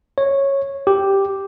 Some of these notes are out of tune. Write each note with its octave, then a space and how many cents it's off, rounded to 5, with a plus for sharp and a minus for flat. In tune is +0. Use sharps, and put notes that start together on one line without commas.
C#5 -10
G4 +0